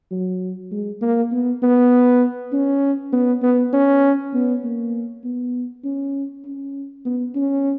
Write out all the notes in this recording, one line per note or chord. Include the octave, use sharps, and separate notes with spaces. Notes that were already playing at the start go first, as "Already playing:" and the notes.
F#3
G#3
A#3
B3
B3
C#4
B3
B3
C#4
B3
A#3
B3
C#4
C#4
B3
C#4